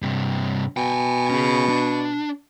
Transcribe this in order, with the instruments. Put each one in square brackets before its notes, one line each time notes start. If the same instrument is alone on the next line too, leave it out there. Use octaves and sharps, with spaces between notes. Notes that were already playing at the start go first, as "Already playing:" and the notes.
[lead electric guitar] G2 C3
[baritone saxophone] B2 [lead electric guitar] G5 G#5
[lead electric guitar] C#4 G#4
D4